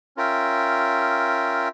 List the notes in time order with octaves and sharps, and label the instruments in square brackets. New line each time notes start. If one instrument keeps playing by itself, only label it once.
[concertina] C#4 F4 A#4 E5 G5